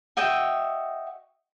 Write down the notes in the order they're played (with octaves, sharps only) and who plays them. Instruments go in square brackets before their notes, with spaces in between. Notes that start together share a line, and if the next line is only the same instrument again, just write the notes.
[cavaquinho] F#4 D#5 E5 G5